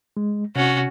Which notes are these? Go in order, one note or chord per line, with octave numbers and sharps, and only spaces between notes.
G#3
C3 C#4 F#4